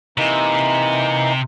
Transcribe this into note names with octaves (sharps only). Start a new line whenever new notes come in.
C3 E3 A#3 D#4